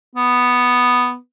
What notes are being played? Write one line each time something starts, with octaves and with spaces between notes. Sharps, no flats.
B3